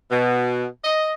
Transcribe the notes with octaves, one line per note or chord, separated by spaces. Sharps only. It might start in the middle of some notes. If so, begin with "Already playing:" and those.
B2
D#5